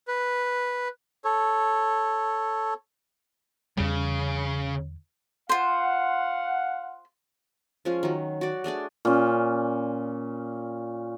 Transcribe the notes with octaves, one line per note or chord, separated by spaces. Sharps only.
B4
A4 C#5
E2 C#3 G3
F4 C5 F5 F#5
F3 G#3 C#4 F4
D#3 F#3
F#4 D5
A3 D4 G#4 D5
A#2 C#4